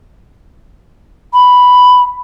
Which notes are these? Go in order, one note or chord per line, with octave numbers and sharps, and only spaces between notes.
B5